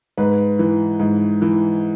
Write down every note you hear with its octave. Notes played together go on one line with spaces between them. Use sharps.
G#2 B4
E3
G#2
E3